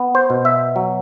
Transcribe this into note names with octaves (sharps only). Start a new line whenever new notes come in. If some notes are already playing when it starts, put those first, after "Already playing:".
Already playing: B3
C5
B2
E5
F#3